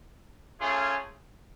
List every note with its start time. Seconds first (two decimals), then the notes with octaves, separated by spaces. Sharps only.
0.59 A3 C#4 F4 G#4